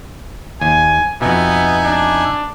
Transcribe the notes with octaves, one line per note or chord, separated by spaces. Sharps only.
D#2 G#5
F2 B2 B3 D#4 E5 G#5
D4